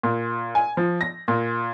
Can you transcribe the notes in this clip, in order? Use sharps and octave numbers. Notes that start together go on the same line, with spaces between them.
A#2
G#5
F3
A#6
A#2